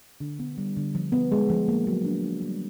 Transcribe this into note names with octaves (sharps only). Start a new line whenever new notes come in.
D3
B3
G3
D3
F3
B3
G#3
F3
A#3
F#3
D4
D4
G3